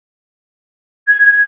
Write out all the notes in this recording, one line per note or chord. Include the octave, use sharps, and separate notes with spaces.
G#6